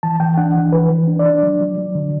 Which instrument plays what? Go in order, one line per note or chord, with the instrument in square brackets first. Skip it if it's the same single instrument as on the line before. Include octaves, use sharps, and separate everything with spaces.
[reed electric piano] E3 A5
E3 G5
D4 F#5
E3
E3 B4
E3
D4
D5
D4
F#3
F#3
F#3
D3